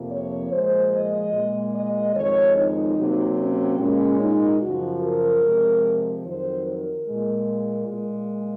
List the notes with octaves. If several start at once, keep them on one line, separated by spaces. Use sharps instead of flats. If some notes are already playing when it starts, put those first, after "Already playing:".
Already playing: F2 C3 F3 A#3
C#5
A#2 F3 G#3 C5
D#5
A#2 G#3
D#5
F2 D#3 G#3 C#5
D#4
C3 F#3 A#3
C#4
A#2 G#3 C#4
D#4
F#2 C#3 F3 F#4
A#4
C3 F3 G#3
F2 D#3 F#3 C5
A#4
A#2 G#3
A#2 G#3